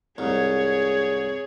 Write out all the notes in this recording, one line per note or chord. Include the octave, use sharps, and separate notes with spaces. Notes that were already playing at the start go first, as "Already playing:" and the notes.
C2 G#2 G#4 C#5